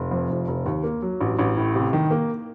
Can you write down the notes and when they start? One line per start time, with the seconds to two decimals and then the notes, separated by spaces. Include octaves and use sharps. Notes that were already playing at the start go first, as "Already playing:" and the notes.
Already playing: F1
0.11 F2
0.30 F1
0.48 F1
0.66 D#2
0.84 A#3
1.02 F#3
1.21 A1
1.39 A1
1.57 A2
1.75 C3
1.93 D#3
2.11 A#3